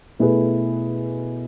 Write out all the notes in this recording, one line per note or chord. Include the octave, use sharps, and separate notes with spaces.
B2 A3 E4 G#4 B4